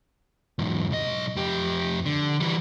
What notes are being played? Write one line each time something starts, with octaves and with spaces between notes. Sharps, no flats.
E2 G#2
B1 D#5
F2 G4
D3
E3 G3